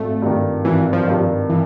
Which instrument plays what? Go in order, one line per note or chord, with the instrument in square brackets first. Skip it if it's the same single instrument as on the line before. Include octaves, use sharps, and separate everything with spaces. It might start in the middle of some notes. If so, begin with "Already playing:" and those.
Already playing: [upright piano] G#1 [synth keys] A3
[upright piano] G2 D#3
[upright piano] G#1 [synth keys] E3
[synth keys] F3
[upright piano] G2 D#3
[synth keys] E3